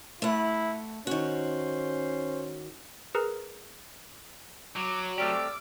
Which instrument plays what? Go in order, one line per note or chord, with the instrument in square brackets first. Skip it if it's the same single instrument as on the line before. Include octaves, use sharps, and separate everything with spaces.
[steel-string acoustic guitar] A3 F#5 [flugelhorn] E4
[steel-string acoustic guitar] D#3 F#4 [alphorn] C#4 [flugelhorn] C5
[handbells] G#4 A#4 B4 A#5 E6
[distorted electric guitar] F#3 [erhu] D6
[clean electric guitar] A3 C4 G4 [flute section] D5 E6 F6 [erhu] D6